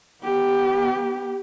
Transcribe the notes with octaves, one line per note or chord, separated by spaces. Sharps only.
B3 G4